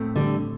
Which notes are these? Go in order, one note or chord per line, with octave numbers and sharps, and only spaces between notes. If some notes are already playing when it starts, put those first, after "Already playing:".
Already playing: A2 A3 C4
D3 G3